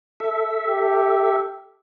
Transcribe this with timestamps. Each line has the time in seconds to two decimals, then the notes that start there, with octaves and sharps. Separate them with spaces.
0.20 A4 E5
0.68 G4